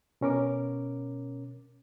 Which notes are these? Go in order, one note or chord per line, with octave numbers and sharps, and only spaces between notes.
B2 C#4 A#4 D6